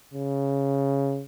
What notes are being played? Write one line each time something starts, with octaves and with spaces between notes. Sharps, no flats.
C#3